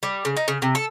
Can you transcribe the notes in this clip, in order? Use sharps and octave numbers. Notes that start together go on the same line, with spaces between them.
G3
C#3
D#4
C#3
C3
A4